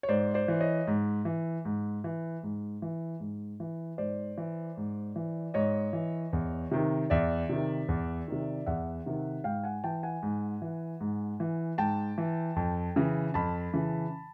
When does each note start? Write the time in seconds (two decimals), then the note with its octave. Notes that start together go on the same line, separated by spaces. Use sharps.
0.03 C#5
0.09 G#2 C5 D5
0.34 C5 D5
0.48 E3
0.61 C#5 D#5
0.87 G#2
1.25 E3
1.65 G#2
2.04 E3
2.43 G#2
2.82 E3
3.20 G#2
3.60 E3
3.98 G#2 C5 D5
4.38 E3
4.77 G#2
5.16 E3
5.54 G#2 C#5 D#5
5.93 E3
6.33 E2
6.71 C3 D#3
7.10 E2 D5 E5
7.49 C3 D#3
7.88 E2
8.28 C3 D#3
8.66 E2 E5 F#5
9.06 C3 D#3
9.44 G#2 F5 G5
9.64 F#5 G#5
9.84 E3 G5 A5
10.03 F#5 G#5
10.23 G#2
10.62 E3
11.00 G#2
11.40 E3
11.78 G#2 G5 A5
12.18 E3
12.56 F2
12.96 C#3 E3
13.34 F2 A5 B5
13.73 C#3 E3